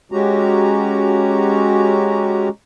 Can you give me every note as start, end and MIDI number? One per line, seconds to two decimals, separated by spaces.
0.12 2.49 56
0.12 2.49 61
0.12 2.49 66
0.12 2.49 67
0.12 2.49 82